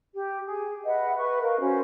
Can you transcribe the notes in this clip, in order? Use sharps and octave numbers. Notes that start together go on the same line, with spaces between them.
G4
G#4
B4 D#5 E5 F#5
B4 C#6
A#4 F5
C#4 F#4 C5